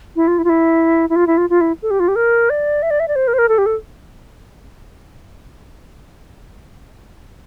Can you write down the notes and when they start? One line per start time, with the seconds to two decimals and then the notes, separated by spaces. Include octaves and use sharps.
0.16 E4
0.27 F4
0.38 E4
0.44 F4
0.49 E4
1.09 E4
1.16 F4
1.27 E4
1.37 F4
1.50 F4
1.61 E4
1.82 A4
1.90 G4
2.00 F4
2.08 G4
2.16 A#4
2.50 D5
2.82 E5
2.90 D5
3.00 E5
3.08 D5
3.15 C5
3.27 A#4
3.33 C5
3.38 A#4
3.49 A4
3.58 G4
3.66 A4